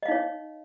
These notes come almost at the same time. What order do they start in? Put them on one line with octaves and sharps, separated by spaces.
D#5 F5 D#4 C#5